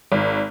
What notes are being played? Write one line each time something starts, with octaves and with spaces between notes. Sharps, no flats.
G#1